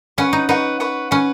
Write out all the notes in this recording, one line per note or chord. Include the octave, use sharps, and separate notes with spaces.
C#4 B4 F#5 C#6
D#4
D#4 B4 F#5 C#6
B4 F#5 C#6
C#4 B4 F#5 C#6